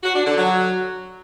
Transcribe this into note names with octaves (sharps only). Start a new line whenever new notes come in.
F#4
D4
D3
F#3